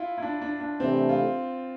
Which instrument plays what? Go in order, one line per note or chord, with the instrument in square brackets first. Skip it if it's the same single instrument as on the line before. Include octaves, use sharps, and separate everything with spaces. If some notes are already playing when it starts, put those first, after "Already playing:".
Already playing: [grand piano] E4 F4
E4
D4
D4
D4
[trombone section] C3 E3 A3 D4 [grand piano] C4
[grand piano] F4